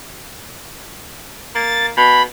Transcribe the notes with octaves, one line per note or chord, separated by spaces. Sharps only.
A#3 A6
B2 B5